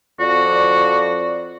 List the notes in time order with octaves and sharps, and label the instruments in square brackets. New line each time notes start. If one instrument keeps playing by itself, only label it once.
[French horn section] F2 D5 [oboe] F#4